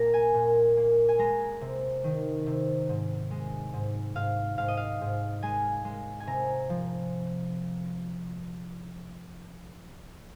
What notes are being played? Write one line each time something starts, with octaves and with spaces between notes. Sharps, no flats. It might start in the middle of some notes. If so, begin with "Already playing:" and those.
Already playing: A#2 A#3 A#5
G#5
A#2
A#3
G#5
G#3 A#5
C3
D#3
C3
G#2
G#3
G#2
G#2 F5
G#2 F5
D#5
F5
G#2
G#3 G#5
G#3
G#5
C3 A#5
F3